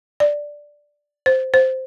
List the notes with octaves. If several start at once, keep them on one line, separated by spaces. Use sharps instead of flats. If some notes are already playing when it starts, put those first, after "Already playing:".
D5
C5
C5